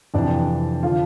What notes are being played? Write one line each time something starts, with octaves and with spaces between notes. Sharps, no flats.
F2 C3 E3 D4 D5
D3 F3 F4 F5